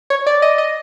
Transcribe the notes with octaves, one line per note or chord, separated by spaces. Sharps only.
C#5
D5
D#5
D#5